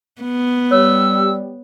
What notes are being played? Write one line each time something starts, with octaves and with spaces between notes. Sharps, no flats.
B3
G3 C#5 E6